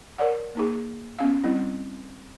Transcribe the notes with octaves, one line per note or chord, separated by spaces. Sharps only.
A#4 C#5 D5 F#5
A#3 D#4 G#4
B3 C#4 F5
G3 C4 E4